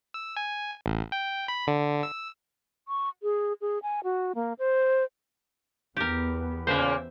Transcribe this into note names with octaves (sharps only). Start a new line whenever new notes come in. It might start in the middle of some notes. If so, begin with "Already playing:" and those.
E6
G#5
A1
G5
B5
D3
E6
C#6
G#4
G#4
G#5
F#4
A#3
C5
E2 B3 G4 A#4
A#2 C#3 A#3 C5 E5